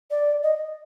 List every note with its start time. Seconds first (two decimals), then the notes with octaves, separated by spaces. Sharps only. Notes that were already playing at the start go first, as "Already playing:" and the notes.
0.11 D5
0.43 D#5